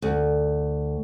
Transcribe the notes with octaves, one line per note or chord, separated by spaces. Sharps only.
D2